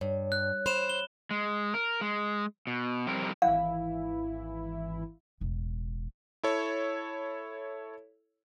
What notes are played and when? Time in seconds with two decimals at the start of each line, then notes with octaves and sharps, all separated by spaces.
0.01 G2 C#5
0.32 F#6
0.66 C5 B5 E7
0.90 G7
1.31 G#3
1.74 A#4
2.01 G#3
2.67 B2
3.07 F2 G3 C4 A#4
3.42 G#1 E3 E4 F5
5.41 E1 A1
6.43 E4 A4 C#5